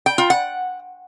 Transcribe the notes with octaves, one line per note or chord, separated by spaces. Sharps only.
G5
F4
F#5